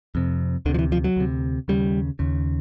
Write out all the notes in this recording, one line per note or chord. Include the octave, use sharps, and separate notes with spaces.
F2 C3
D2 C3 D3
F3
E3
F3
F#3
D2 C3
D#2 C#3 G3
D#2 C#3